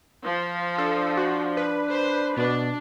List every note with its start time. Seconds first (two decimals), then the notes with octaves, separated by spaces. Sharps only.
0.24 F3
0.78 D4 A4
1.17 F#4
1.57 B4
1.90 C5
2.37 B2 D4